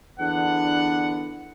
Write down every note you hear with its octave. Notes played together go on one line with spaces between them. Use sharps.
E2 D3 B3 D4 F#5